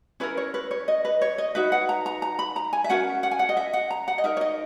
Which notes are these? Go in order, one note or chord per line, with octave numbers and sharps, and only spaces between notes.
C#4 E4 A#4 B4
C#5
B4
C#5
D#5
B4
C#5
D#5
D#4 F#4 B4 E5
F#5
A#5
A#5
A#5
B5
A#5
G#5
E5
C#4 F#4 A#4 F#5
F#5
G#5
F#5
D#5
E5
F#5
A#5
F#5
D#5
D#4 A#4 E5
C#5
D#5